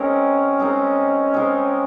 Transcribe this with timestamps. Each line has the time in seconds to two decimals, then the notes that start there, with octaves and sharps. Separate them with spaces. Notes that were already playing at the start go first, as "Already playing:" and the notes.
Already playing: G#3 C4 C#4 D#4 A#4
0.59 G#3 C4 D#4 A#4
1.34 G#3 C4 D#4 A#4